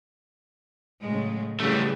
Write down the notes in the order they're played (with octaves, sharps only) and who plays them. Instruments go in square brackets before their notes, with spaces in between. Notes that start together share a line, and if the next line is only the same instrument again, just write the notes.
[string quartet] A2 [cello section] C#3 F#3 G#3
[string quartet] C#3 E3 [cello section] F#3 G4 G#4 [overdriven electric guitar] G3 A3